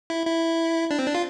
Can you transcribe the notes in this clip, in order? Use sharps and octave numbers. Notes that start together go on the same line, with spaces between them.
E4
E4
D4
C4
D4
F4